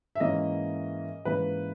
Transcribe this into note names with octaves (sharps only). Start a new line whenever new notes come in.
E5
G#2 E3 A#3 C#4 D#5
G#2 E3 A#3 C#4 B4